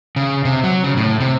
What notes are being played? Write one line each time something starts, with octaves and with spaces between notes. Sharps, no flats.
C#3
C3
F#3
C#3
A2
C3